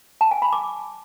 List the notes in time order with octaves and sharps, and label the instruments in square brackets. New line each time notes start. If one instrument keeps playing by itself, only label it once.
[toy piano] A5
G#5
B5
D6